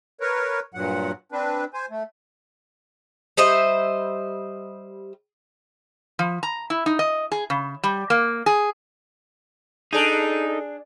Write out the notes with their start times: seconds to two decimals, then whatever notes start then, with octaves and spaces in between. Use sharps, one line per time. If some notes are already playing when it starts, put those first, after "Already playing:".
0.21 A#4 B4 C#5
0.74 G2 A#2 F#3 F#5
1.32 C4 D4 B4
1.74 C5 G#5
1.90 A3
3.37 G3 C5 D#5 E5
6.19 F3
6.43 A#5
6.70 E4
6.86 D#4
6.99 D#5
7.32 G#4
7.50 C#3
7.83 G3
8.10 A#3
8.46 G#4
9.93 D4 D#4 G#4 A4